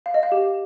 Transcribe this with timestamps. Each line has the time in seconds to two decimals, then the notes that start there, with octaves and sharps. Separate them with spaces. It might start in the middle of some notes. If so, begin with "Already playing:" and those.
0.06 F5
0.14 D#5
0.23 F5
0.32 G4